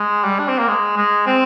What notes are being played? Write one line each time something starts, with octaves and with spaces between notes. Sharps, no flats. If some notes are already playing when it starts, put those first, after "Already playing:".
Already playing: G#3
G3
D4
C4
A#3
G#3
G#3
C4